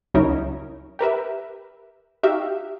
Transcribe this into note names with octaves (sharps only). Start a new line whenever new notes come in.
C#2 F#3 C#4 D#4 E4 A#4
G4 A#4 B4 E5
D#4 F#4 G4 E5 F5